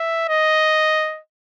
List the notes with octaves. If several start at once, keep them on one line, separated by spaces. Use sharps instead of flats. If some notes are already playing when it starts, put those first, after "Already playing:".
Already playing: E5
D#5